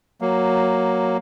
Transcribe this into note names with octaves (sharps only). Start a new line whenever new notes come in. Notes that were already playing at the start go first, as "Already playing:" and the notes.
F#3 A#3